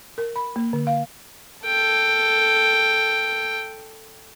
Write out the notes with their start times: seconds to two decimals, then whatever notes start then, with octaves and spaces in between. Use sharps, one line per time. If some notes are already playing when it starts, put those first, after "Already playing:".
0.18 A#4
0.36 B5
0.56 A#3
0.73 D3
0.87 F5
1.65 A4 G5